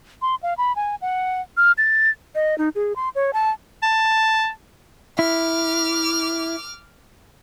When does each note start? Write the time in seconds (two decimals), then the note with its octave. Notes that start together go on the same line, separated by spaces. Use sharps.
0.22 C6
0.43 F5
0.58 B5
0.76 G#5
1.02 F#5
1.57 F6
1.78 A6
2.35 D#5
2.58 D#4
2.75 G#4
2.96 C6
3.15 C#5
3.33 A5
3.83 A5
5.19 E4 D6 F6